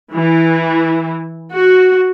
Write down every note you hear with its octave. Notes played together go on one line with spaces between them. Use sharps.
E3
F#4